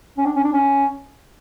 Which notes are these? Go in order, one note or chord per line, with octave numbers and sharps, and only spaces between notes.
C#4
D4
C#4
D4
C#4